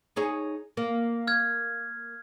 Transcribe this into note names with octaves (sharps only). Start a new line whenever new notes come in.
D#4 G#4 C#5
A#3
F6 G#6